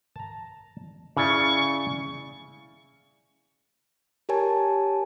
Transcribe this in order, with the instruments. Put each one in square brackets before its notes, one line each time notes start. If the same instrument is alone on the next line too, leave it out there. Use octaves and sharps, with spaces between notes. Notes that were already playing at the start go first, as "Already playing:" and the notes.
[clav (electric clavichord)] A5 A#5
[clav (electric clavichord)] C#3 E4 D5 [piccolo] C#6
[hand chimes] G4 A#4 C#5 G#5 A5